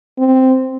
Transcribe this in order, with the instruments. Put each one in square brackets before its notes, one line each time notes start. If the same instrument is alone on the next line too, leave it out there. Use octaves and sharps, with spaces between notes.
[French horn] C4